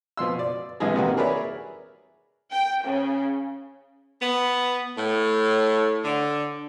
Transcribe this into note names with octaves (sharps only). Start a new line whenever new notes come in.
B2 F3 C6 E6
D5
A#1 F2 E3 G3 G#3 G#4
C3 D#3 E3 G3 A#3 F#4
G#4 A#4 B4 C#5 D5 E5
G5
C#3
B3
A2
D3